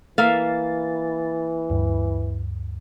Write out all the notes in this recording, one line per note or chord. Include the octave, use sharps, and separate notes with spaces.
E3 A#3 E5 F5 A6
D2 G2